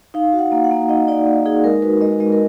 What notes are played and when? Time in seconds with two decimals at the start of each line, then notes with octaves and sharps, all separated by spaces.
0.14 D#4 F5
0.33 F#4
0.39 F#5
0.52 A#3
0.64 F#5
0.71 A#3
0.89 D#4 D#5
1.08 D#4 D5
1.27 A#3
1.45 D#4 G#4
1.64 G#3 A#4
1.82 F#4 B4
2.01 G#3 D#5
2.20 G#3 D#5
2.32 A#4